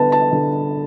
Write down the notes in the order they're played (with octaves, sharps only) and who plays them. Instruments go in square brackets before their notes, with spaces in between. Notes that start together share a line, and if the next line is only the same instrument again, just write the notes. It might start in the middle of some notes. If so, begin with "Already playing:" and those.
Already playing: [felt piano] D3 B3 B4 A5
A5
D3